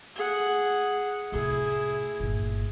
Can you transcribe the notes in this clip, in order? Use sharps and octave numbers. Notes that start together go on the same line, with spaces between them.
G#4 F#5
A2 C3 E4 G#4
G1 A#2